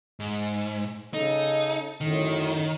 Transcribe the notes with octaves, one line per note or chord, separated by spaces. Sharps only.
G#2
C#3 D#4 A4
F#2 A2 D3 D#3